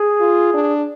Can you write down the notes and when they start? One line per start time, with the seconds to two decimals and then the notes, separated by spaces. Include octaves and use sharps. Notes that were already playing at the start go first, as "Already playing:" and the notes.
Already playing: G#4
0.21 F4
0.54 D4